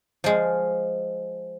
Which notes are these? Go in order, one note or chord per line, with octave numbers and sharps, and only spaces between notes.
F3 G#3